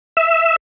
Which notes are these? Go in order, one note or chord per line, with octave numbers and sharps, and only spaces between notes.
E5